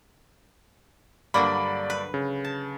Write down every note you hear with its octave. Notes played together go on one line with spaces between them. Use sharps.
G2 D3 F#3 A#3 D5 B5
B4
C#3
A5